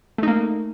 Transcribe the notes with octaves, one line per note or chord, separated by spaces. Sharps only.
A3 A#3 D#4